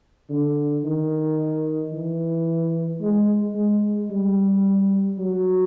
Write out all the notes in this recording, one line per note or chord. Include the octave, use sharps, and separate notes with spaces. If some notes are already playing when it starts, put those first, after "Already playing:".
D3
D#3
E3
G#3
G#3
G3
F#3